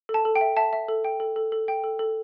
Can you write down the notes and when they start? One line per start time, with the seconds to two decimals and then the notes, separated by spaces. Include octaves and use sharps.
0.09 A4
0.14 A5
0.25 A4
0.36 G5
0.41 E5
0.57 E5 A5
0.73 E5
0.89 A4
1.05 G5
1.20 A4
1.36 A4
1.52 A4
1.68 G5
1.84 A4
1.99 A4